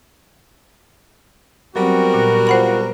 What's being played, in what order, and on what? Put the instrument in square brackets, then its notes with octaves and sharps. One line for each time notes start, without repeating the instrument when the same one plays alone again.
[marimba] F#3 [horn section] G3 B3 F#4 [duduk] C4 [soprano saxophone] A#4
[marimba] A#2
[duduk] F4 [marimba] C5 F#5 B5